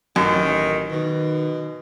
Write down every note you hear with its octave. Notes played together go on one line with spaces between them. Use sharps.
A1 F#2 D#3
B2 D#3